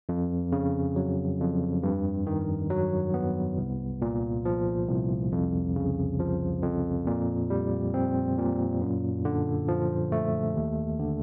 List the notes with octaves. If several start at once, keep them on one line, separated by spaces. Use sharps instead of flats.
F2
C#3
F#3
F2
G2
D#3
F#3
B3
C2
A#2
F3
C2
F2
C#3
F3
F2
A#2
G3
C4
A#2
F#2
D3
F3
A3
D#2
D3